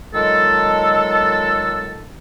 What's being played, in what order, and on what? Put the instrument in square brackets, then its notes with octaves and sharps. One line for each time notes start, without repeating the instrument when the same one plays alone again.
[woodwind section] A#2 D#3 F#3 G#3 A4